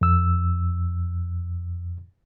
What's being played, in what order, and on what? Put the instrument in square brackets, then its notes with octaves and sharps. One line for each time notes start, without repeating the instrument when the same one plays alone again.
[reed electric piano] F2 E6